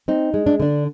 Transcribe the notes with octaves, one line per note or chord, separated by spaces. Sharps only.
C4 D#4
G#3
D4
D3 D4